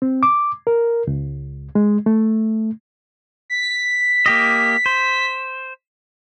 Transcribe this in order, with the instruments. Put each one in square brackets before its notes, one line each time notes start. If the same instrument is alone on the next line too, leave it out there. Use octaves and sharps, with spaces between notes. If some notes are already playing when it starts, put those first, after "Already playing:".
[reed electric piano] C4
D6
A#4
C#2
G#3
A3
[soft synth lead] B6
[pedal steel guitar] A#3 G4 D#5
C5